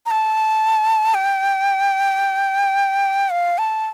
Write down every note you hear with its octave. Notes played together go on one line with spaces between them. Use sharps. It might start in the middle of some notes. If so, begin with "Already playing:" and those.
A#5
A5
G5
F5
A5